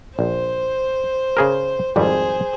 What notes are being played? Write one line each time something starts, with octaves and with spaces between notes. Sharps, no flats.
A#1 C5
C#3 G#4 A#4
G#1 F2 G3 G#4 C5